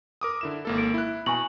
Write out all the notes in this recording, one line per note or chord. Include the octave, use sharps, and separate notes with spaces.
A#4 D6 D#6
D3 E4 E7
G#1 A#3 A4
D7
E4 F#6
B2 G#5 A#5 C#6 F#7